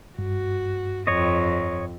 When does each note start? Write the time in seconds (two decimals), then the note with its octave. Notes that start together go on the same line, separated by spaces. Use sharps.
0.19 G2 F#4
1.07 F2 C#5 D#5